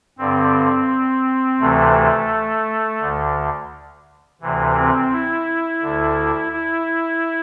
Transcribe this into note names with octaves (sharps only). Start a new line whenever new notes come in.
G2 D3 C4
D2 C3 E3 A3
D2 D3
D2 C3 E3
C4
E4
D2 D3
E4